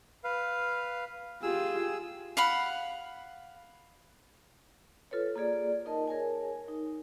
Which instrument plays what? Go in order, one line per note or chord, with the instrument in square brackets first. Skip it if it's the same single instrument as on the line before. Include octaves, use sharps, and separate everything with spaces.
[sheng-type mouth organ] B4 F5
[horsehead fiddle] F4 G4 [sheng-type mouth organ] G#4 E6
[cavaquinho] F5 F#5 B5
[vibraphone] F4 A4 B4 C#5
A#3 F4 G#4 D5
D#4 A#4 D#5 A5
G#4 A#4 C#5 G#5
D#4